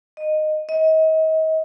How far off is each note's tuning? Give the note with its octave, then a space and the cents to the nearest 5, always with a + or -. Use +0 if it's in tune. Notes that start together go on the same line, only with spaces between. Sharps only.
D#5 -15
D#5 +35